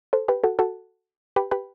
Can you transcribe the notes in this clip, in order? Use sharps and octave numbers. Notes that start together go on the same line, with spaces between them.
A4 C5
G4 B4
F#4 A4
F#4 A4
G4 B4
G4 B4